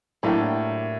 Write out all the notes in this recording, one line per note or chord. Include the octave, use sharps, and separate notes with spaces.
A2 F#3 A#3 D4 G4